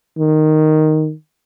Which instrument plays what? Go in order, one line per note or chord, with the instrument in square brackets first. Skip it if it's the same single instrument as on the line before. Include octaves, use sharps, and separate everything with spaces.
[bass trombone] D#3